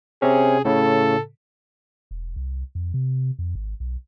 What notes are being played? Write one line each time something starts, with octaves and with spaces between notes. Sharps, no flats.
C3 C4 C#4 G#4
A2 C#3 A4
E1
C2
F2
C3
F2
G#1
B1